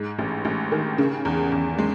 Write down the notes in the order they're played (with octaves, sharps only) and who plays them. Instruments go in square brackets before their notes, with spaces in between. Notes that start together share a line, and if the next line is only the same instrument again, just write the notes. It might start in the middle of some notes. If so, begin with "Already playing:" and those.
Already playing: [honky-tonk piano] G#2
A1
A1
D#3
C#3
E2
E2
G#3